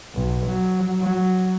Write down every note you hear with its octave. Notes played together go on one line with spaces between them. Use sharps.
B1
F#3
F#3